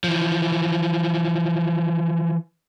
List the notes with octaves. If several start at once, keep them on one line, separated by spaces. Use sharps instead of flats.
E3 F3